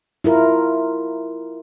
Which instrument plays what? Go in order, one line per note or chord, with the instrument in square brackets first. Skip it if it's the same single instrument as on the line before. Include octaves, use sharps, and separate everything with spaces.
[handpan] E4 F4 A#4